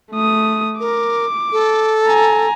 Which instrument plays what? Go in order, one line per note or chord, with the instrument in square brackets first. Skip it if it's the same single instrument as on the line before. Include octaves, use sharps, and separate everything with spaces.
[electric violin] A3 D#6
[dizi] A#4 [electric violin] D6
[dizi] A4
[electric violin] G#5 A#5